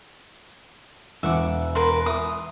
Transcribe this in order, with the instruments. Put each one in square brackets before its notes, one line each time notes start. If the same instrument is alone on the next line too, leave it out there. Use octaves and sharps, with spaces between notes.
[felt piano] E1 [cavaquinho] E5 F#5 D6
[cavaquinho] A#4 B4 C6
[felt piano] E5 [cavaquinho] D#6